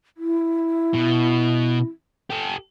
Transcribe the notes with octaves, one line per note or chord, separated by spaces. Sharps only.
E4
B2
G4 A4